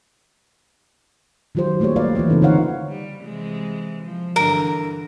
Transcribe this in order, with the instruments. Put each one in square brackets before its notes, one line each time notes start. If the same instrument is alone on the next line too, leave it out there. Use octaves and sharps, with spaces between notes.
[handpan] D#3 F#3 F4 G4 C5
G3 A3 A#3 G4 C#5
F4 B4 D5 F5
E3 E4 F4 B4
C#3 C4 D#4 A4
D3 D#4 C5 C#5 F5 F#5
[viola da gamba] G3
C3 E3 G#3
F3
[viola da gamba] G2 D3 E3 [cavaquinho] A#4